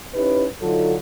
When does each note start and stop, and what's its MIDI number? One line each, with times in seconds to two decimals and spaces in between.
0.15 0.45 61
0.15 0.45 63
0.15 0.45 64
0.15 0.45 67
0.15 0.45 71
0.62 0.96 50
0.62 0.96 54
0.62 0.96 63
0.62 0.96 65
0.62 0.96 69